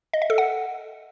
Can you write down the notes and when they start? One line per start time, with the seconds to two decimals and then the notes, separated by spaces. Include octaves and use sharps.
0.13 D#5
0.22 E5
0.30 A4
0.38 F#5